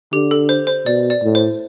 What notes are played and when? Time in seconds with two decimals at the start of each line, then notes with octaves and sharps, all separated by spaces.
0.13 D3 G4
0.31 A4
0.49 C5
0.67 C5
0.86 B2 D5
1.10 D5
1.24 A2
1.35 C5